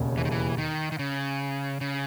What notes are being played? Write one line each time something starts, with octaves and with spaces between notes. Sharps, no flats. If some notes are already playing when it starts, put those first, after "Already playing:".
Already playing: E1 D#2 C#3
E3
D#3
E3
D#3
D#3
C#3
C#3